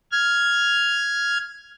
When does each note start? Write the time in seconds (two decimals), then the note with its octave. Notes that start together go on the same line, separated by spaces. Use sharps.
0.12 F6 G#6